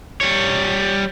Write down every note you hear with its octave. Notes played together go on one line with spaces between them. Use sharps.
G3 C#5